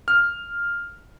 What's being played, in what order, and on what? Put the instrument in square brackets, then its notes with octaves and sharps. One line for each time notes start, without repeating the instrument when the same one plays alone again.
[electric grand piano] F6